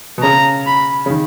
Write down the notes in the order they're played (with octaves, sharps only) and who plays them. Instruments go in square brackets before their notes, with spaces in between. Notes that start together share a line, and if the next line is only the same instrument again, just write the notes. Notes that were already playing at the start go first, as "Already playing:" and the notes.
[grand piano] B2
[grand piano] C#3 [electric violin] A#5
[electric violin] B5
[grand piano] C#3
D#3